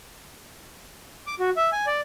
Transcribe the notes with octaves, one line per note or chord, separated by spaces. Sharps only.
D6
F#4
E5
G#5
D5